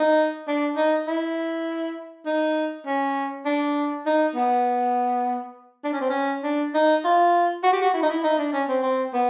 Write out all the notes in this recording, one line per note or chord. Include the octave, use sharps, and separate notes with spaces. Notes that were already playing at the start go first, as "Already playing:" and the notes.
Already playing: D#4
D4
D#4
E4
D#4
C#4
D4
D#4
B3
D4
C#4
C4
C#4
D4
D#4
F4
F#4
G4
F#4
E4
D#4
E4
D#4
D4
C#4
C4
C4
B3